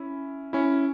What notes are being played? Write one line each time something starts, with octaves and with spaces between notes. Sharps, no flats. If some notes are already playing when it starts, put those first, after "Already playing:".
Already playing: C#4 E4
C#4 E4